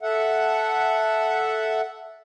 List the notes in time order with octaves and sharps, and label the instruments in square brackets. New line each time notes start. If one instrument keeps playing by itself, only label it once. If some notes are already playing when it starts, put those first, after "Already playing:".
[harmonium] A4 E5 F#5